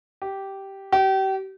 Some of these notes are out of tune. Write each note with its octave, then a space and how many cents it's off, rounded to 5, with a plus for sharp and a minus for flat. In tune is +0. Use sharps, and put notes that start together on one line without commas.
G4 -10
G4 -35